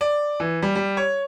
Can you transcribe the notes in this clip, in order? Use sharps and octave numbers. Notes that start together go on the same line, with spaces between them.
D5
E3
G3
G3
C#5